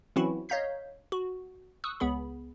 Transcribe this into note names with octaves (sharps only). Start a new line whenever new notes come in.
E3 F#3 C4 C#4 E4 F#4
C#5 D#5 F5 A#5 G6 B6
F#4
C#6 D#6 E6 F#6
C#2 B3 G#4 B5